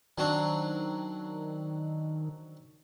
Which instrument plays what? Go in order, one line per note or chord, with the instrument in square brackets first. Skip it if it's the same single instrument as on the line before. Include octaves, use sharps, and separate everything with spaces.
[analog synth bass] D#3 [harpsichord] F#3 C4 D4